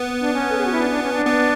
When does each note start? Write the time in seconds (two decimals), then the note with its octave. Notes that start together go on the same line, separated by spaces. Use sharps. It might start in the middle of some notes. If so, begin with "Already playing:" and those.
Already playing: B3
0.22 D4
0.34 C#4
0.49 A4
0.57 G#4
0.64 F#4
0.72 E4
0.80 D4
0.90 D4
1.03 C#4
1.14 D4
1.25 B3